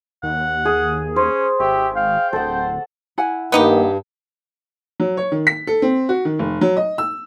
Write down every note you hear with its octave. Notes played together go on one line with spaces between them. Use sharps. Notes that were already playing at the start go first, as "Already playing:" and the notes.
D#2 F#5
G#4
C#4 C5
G#1 G4 E5 C#6
F5 G5
D1 A4 C5 F#5
E4 F#5 G#5
G2 D#3 A#3 B3 D#4 G4
F#3
C#5
D#3
B6
A4
C4
F#4
D#3
F1
F#3
D#5
E6